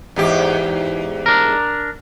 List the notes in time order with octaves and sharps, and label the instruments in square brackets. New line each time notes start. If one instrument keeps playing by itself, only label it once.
[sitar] E2 G#2 G4
[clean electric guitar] D4 A#4